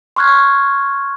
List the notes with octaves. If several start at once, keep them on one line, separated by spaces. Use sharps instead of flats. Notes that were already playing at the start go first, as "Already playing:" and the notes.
C6 C#6 F6 F#6 G#6